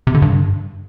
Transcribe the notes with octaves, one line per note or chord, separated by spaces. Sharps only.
C3
D3
G2